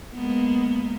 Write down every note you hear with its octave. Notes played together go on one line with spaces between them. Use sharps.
G#3 A#3 B3